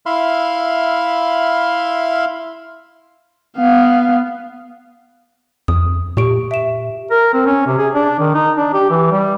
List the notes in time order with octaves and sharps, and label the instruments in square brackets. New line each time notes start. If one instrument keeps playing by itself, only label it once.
[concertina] E4 E5 F5 B5 C6 F6
[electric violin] B3 F5
[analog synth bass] F2 [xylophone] D#6
[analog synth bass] A#2 [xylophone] G4 C#6 D7
[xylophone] E5 E7
[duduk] A#4
C4
C#4
C3
G#4
D4
D#3
D#4
D4
G4
E3
G3